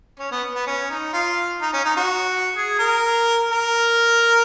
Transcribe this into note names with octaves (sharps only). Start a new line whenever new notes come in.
C#4
B3
B3
C#4
D#4
F4
D#4
C#4
D#4
F#4
G#4
A#4
A#4